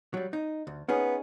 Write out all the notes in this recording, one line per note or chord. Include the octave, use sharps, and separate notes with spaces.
F#3 G3
D#4
D2
B3 C#4 D#4 G#4